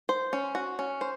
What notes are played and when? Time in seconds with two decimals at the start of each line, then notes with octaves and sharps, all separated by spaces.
0.09 C5
0.33 C#4
0.55 F#4
0.79 C#4
1.01 C5